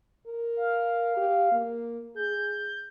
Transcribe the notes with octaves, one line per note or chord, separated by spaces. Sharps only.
A#4
F5
G4
A#3
G#4 G6